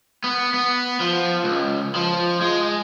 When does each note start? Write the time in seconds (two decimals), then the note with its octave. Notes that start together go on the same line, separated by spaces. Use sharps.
0.24 B3
0.54 B3
1.00 F3
1.44 C#2
1.95 F3
2.41 G#3